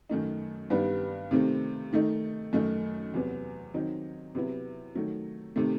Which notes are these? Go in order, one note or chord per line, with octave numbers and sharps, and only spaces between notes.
F#2 D#3 A3 D#4
G2 D#3 G3 B3
C3 D#3 A3 C4
D#3 A3 D#4
F#2 D#3 A3 D#4
E2 C3 F#3 B3
D#3 F#3 C4 D#4
C3 F#3 B3 E4
D#3 F#3 A3
C3 D#3 A3